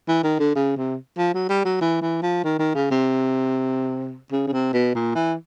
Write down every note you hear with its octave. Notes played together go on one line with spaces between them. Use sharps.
E3
D#3
D3
C#3
C3
F3
F#3
G3
F#3
E3
E3
F3
D#3
D#3
C#3
C3
C#3
C#3
C3
B2
A#2
E3